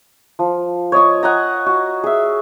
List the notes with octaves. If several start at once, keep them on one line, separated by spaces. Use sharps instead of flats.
F3
C#5 D#5 C#6
D#5 F#5 G#5 A#5
F#4
G#4 E5